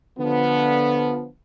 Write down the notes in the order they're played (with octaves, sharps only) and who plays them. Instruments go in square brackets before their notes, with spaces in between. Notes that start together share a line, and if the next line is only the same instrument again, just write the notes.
[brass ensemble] D3 F3 B3